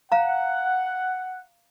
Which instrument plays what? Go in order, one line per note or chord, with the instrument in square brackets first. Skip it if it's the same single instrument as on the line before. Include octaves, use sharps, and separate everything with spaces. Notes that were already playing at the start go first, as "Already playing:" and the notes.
[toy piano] F5 A#5 [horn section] F#5